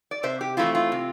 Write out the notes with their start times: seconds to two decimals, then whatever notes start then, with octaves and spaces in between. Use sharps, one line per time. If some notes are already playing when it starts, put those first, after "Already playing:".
0.11 D5
0.23 C3 C5 E5
0.41 G4
0.57 E3 A3 C4 E4 F4
0.75 F4
0.92 C3